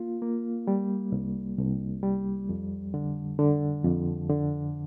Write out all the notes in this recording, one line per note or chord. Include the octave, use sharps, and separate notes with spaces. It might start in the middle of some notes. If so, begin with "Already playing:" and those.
Already playing: A#3 F4
A#3
G3
C2
C2
G3
F2
D3
D3
F2
D3